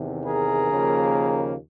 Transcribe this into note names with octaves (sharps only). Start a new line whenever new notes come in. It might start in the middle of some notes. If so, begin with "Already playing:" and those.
Already playing: E2 C3 D#3
G#4 A#4
D#2 C#3 F3 A#3